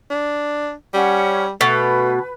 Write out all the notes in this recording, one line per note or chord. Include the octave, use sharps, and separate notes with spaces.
D4
G3 C#4 F#5
B2 A3 B4